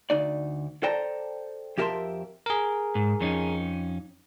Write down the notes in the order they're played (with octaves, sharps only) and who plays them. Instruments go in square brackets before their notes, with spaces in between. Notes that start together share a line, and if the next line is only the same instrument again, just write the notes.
[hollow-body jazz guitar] D2 D#4 D5
A4 C5 D5 G5 A5 A#5
F2 G4 A#4 E5 A5 C6
[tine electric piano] G#4 A#4
[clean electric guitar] G#2
F2 C#4 D#4